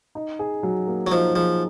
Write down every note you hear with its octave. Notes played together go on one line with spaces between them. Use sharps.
D#4
G#4
F#3
A#3
F#3
F3 D#4
F3 G#4